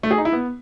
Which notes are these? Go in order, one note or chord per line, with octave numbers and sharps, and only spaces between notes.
A3
G#4
D#4
E4
B3